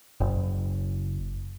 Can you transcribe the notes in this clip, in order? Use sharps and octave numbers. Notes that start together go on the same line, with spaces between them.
F#1